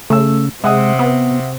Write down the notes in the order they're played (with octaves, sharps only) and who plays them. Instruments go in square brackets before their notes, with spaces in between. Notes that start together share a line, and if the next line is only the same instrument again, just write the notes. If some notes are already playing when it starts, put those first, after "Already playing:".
[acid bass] C#3 [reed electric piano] A3 E6
[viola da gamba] C3 [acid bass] G#3 [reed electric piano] E5 F#5 D#6
[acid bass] B3